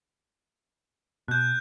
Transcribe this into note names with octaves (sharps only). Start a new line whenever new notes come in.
B2 F#6 G6